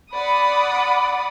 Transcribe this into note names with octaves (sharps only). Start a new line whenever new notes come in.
D5 F#5 B5 D#6